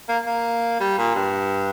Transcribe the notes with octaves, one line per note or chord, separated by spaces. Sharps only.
A#3
A#3
G3
A#2
G2